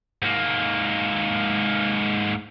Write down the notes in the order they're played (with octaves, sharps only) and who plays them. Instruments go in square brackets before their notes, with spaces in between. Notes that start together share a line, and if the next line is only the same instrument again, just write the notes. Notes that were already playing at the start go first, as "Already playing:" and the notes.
[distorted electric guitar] G#2 A#3